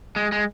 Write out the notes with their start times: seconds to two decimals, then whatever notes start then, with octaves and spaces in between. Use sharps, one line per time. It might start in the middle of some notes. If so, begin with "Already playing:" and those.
0.16 G#3
0.32 G#3